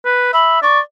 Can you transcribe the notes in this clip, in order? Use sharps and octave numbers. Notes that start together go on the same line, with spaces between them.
B4
E5 B5
D5 C#6